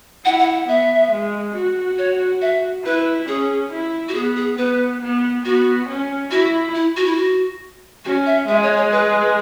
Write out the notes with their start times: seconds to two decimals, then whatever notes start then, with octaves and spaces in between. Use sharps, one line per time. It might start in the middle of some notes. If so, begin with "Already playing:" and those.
0.25 E4 F#5
0.39 F#5
0.54 F#5
0.68 B3 E5
1.11 G#3
1.54 F#4
1.98 C#5
2.42 E5
2.85 E4 B4
3.28 C#4 G#4
3.72 E4
4.09 F#4
4.14 B3 G#4
4.36 G#4
4.58 B3 B4
5.01 B3
5.45 B3 F#4
5.88 C#4
6.31 E4 F#4
6.75 E4
6.96 F#4
7.06 E4
7.16 F#4
8.05 C#4 F#4
8.26 E5
8.48 G#3 E5
8.63 C#5
8.77 C#5
8.92 B4